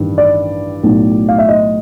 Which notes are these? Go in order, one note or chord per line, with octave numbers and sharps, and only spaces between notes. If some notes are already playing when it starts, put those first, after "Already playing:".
Already playing: A1 G2 D#3
D5
B1 A2 F#3
F5
E5
D#5